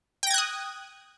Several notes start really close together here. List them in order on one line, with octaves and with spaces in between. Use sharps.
G5 A#6 G#6 F#6 D#6